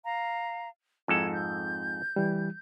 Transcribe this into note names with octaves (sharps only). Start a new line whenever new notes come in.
F5 A#5
F2 G#2 D#4 E4 A4 G#6
G6
E3 G3